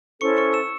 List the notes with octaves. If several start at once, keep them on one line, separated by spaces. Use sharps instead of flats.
C#4 E4 A4 C5 C#6 C#7
C#6 C#7
E6 E7